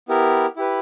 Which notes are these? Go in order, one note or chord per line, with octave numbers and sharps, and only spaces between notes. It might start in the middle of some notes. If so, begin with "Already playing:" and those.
B3 E4 G4 A#4
E4 G4 B4